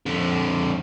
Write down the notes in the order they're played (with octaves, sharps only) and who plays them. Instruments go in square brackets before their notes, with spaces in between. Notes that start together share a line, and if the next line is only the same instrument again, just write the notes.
[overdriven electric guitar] F2 D3